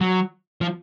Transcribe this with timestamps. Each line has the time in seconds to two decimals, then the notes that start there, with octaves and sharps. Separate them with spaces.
0.01 F#3
0.61 F3